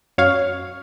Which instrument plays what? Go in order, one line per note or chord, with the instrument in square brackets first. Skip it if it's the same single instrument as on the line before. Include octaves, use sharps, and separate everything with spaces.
[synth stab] F#2 C#5 F5